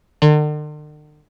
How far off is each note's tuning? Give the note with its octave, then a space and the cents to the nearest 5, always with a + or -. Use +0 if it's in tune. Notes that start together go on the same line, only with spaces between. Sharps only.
D3 +45